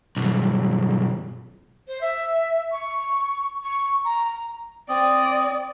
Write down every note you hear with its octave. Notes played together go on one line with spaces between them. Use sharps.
B1 G2
C5
E5
C#6
C#6
A#5
C4 D5 D#6